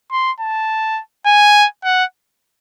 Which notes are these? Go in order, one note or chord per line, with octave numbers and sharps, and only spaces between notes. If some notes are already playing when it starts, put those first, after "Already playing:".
C6
A5
G#5
F#5